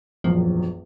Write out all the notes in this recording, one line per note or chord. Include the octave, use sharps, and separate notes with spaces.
E1 A#1 F#2 F3